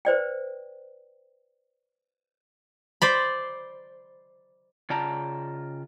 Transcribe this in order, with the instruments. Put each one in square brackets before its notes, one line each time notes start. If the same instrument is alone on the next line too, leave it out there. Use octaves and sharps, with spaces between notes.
[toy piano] B4 C5 D5 G5
[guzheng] C5 D5 B5
[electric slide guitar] C#3 F4 D5 G5 A5 A#5